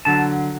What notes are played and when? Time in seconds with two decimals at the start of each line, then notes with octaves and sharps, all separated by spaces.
0.05 D3 F#3 A5